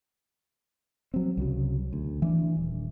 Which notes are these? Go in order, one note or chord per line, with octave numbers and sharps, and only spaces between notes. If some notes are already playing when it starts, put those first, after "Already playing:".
F#3 C4
C2 C#3 F#3
D2
E3 C#4 D4
D#1